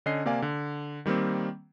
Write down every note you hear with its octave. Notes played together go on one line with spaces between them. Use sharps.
D3 C#4 D#5 C7
C3 A#3 D5 F5 G#5
D3
D#3 G3 A#3 C4